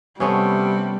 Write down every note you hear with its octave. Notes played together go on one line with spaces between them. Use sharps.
C3 G3 A3 B3 C#4